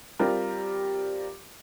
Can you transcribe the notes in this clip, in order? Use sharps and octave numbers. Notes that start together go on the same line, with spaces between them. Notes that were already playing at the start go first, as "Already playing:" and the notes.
G3 C4 F4 A#4